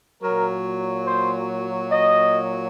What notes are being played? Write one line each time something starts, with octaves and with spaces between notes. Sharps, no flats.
A#2 F#3 A#4
C5
D#5